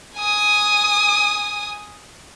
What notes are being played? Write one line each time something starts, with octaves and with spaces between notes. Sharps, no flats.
G#5 D#6